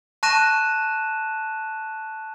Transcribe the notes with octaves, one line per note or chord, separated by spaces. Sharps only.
A5 C#6 F#6 A#6 D#7 E7